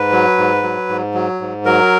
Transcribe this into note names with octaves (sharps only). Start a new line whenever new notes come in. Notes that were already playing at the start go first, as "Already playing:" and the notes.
Already playing: G#2 B4
F#3
G#2
F#3
G#2
F#3
G#2
F#3 A#4